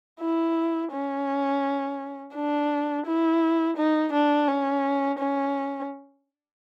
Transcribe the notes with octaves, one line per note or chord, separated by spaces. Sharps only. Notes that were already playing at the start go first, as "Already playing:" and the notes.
E4
C#4
D4
E4
D#4
D4
C#4
C#4